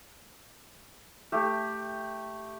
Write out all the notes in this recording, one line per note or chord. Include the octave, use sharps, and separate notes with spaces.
A3 G4